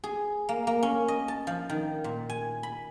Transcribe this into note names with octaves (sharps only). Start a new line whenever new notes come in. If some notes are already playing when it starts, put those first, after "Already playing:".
G#4
A#3
A#3
C#4
D#5
A5
F3
D#3
A#2
G#5
B5